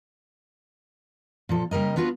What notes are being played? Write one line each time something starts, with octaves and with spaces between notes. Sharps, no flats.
A#2 F3 A4
C#3 G3 A#3 A#4 D#5
B3 D4 F4 F#4 A#4 B4